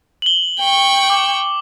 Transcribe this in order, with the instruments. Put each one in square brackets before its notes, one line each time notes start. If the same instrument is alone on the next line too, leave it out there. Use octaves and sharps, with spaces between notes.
[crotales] F#7 G7
[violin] G5 C#6
[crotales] D6